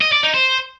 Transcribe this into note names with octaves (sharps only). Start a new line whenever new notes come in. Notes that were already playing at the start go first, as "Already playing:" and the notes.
D#5
D5
D#4
C5